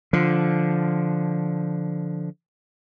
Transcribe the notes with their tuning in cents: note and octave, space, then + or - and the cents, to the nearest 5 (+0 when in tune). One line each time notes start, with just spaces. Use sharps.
D3 +0 F3 +0